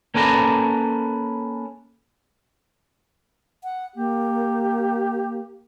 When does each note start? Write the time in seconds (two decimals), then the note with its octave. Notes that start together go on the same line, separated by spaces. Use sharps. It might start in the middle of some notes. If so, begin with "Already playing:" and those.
0.14 A#3 C#4 A4 B4 D5 A#5
3.64 F#5
3.96 A#3 G4